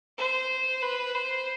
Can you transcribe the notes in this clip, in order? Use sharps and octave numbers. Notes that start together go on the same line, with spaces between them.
C5
B4
C5